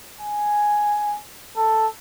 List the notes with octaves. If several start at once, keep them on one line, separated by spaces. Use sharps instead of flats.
G#5
A4